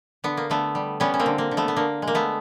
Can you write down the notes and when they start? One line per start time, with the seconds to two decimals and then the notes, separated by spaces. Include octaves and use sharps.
0.24 D3 B3
0.37 A#3
0.50 D3 A3 B3
0.75 G3
1.00 G3 B3 C#4
1.14 C#4
1.19 A#3 C4
1.26 D3
1.38 A#3
1.51 D3
1.57 A3 B3
1.68 B3
1.76 D3 A#3
2.02 G#3
2.07 A#3
2.15 A3 B3